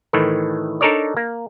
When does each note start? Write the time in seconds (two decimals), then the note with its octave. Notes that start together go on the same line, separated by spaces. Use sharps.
0.13 A2 D#3 E3 A3
0.81 D4 D#4 A4 A#4 C#5 D5
1.17 A#3